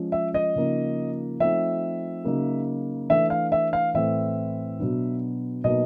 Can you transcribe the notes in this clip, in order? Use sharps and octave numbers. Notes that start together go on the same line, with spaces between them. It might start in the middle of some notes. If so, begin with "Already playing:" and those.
Already playing: F3 G#3 C#4
E5
D#5
C#3 F3 A#3 D#4
F3 A3 C4 D#4 E5
C#3 F#3 A#3 D#4
E3 A3 D4 E5
F5
E5
F5
A2 E3 A3 C4 E5
B2 F#3 B3 D4
B2 F#3 A#3 D#4 D#5